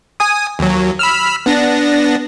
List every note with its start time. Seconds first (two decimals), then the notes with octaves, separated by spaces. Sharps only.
0.20 G#5 D#6
0.59 D#2 F#3
0.99 B5 E6 F6
1.46 B3 D4 A#6